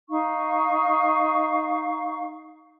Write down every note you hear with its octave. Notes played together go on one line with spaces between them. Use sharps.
D#4 F5 C#6